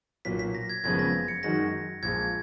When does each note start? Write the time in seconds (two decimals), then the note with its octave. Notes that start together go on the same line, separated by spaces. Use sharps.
0.25 B1 A#2 F#3 A#3 B6
0.39 B6
0.55 A#6
0.69 G#6
0.84 F#1 F2 C#3 G#3 B3 G#6
0.99 A#6
1.28 C#7
1.43 F#2 D#3 G#3 D#4 F#4 A#6
2.03 A#1 A#2 G#3 G#6